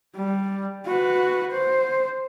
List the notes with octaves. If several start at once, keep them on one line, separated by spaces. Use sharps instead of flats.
G3
F#4 B4
C5